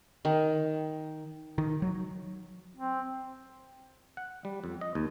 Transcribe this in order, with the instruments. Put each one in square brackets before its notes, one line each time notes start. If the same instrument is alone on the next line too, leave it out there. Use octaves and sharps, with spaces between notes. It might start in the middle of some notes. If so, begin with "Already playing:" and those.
[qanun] D#3
[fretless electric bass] D#3
F#3
[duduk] C4
[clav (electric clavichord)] F#5
G3
F2
D#5
D#2